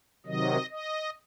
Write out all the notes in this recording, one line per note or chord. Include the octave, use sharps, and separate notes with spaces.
C3 D#3 F#3 D#5
D#5